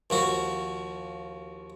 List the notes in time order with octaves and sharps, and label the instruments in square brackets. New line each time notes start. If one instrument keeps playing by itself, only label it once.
[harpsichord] D#2 F3 F#4